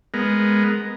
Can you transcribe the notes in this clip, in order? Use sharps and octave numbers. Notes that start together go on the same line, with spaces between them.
G#3 B3 A#4